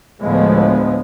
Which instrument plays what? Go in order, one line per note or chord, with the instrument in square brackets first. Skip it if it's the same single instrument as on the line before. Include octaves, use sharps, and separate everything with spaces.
[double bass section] D2 A2 F3 G#3 B3